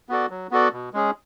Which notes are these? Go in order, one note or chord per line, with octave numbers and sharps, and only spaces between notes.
B3 F#4 A4 D5
F#3
B3 F#4 A4 D5
B2
G#3 C#4 G#4